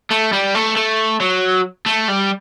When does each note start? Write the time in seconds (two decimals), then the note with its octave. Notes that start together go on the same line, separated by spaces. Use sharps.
0.11 A3
0.33 G3
0.55 A3
0.76 A3
1.20 F#3
1.86 A3
2.08 G3